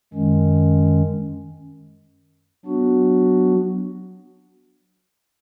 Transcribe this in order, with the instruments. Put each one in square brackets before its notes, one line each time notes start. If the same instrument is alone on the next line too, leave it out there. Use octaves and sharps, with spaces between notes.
[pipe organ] F#2 D#3 G#3 C#4
F#3 B3 D4 F#4